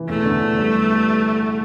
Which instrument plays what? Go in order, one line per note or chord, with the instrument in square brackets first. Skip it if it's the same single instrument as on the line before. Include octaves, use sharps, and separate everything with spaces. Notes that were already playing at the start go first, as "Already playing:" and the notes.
Already playing: [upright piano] E3
[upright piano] E2 [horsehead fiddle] A3
[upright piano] D3
E2
G3